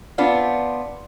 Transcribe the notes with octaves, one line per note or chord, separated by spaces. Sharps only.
B3 C4 D4 F4